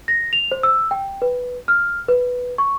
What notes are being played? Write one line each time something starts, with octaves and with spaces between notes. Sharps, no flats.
A#6
F7
C5
E6
G5
B4
F6
B4
C#6